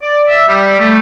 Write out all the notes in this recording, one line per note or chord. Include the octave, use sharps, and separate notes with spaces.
D5
E5
G3
A3